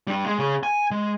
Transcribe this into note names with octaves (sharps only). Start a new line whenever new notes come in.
G3 D4
G#3
C#3 G#4
G#5
G#3